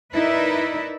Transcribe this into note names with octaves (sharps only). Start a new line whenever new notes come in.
D#4 E4 A#4 B4 D5 E5